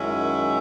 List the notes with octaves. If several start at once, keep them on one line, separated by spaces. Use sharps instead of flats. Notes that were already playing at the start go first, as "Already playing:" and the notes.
Already playing: F#2 D#3 G#3 C#4 E4